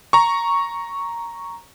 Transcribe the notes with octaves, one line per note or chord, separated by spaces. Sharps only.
A#5 C#6